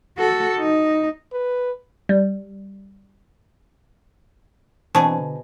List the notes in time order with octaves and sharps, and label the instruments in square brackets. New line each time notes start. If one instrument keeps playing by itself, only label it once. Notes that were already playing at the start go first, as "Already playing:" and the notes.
[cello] F#4 A4
D#4
[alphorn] B4
[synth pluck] G3
[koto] B2 G#4 [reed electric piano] E3 C4 D4 [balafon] C5 A5 C#6
[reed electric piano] D3